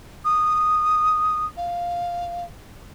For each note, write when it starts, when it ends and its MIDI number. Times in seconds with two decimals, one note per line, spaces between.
0.25 1.46 87
1.57 2.44 77